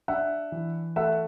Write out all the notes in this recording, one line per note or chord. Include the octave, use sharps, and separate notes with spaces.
D4 E5 F#5
E3
A3 E5 F#5